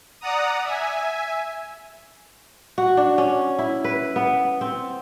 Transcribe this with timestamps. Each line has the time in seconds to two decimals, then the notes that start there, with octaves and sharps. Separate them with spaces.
0.21 D5 F#5 A#5 D#6
0.64 E5 G#5
2.78 F#4
2.97 D4
3.18 C#4
3.59 E4
3.84 B4
4.16 B3
4.61 C4